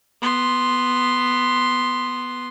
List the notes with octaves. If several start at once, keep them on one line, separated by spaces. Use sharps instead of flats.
B3 C6